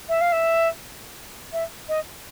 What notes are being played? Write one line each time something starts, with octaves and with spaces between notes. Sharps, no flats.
E5
F5
E5
E5
D#5